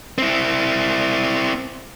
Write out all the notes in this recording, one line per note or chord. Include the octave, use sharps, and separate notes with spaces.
C4 E4